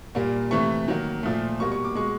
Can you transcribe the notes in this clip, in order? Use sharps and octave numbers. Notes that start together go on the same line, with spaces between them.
A#2 G3 A#3
C3 E3 A3 C#6
D#3 F#3 A#3
A#2 F3 A3
B2 G3 A#3 C#6
C#6
D6
B2 G#3 C#6